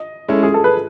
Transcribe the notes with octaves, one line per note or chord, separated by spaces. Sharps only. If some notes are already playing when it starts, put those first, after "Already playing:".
Already playing: D#5
G#3 C#4 E4 A4
G#4
A4
B4